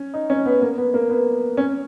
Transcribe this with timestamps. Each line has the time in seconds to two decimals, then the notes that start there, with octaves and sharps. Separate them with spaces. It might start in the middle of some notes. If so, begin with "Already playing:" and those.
Already playing: C#4
0.14 D#4
0.30 C#4
0.46 B3
0.61 A#3
0.78 B3
0.94 A#3
1.10 B3
1.57 C#4